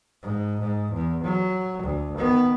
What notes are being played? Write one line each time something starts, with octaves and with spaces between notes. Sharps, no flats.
G#2
G#2
E2
F#3
D2
D#3 B3